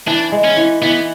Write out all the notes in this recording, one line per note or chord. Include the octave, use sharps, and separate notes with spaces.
E3 D4
G#3
C#4
E3
E3 B3